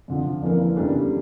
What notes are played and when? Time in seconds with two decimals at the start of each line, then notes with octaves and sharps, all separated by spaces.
0.08 F2 D3 F3
0.42 F1 F2 E3 A#3
0.75 E2 C#3 G3 D4 A4